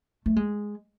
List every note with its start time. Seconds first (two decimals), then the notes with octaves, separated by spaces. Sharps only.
0.26 A3
0.36 G#3